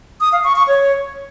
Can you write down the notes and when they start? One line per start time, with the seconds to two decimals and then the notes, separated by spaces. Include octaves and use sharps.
0.21 D#6
0.32 F5
0.44 C#6
0.56 C#6
0.68 C#5